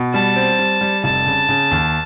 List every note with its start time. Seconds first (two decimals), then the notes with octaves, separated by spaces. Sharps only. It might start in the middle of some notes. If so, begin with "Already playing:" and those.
Already playing: B2
0.14 G3 A5
0.36 C4
0.59 G3
0.81 G3
1.04 F1 A5
1.26 C#3
1.49 C#3
1.71 D#2